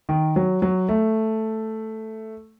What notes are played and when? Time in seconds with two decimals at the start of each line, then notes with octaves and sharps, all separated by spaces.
0.09 D#3
0.36 F#3
0.62 F#3
0.89 A3